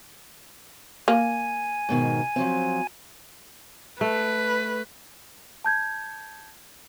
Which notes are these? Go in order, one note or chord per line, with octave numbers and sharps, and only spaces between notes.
A#3 G#5
G#2 B2 D#3
F3 F#3 C4
A3 B4
A5 G6 G#6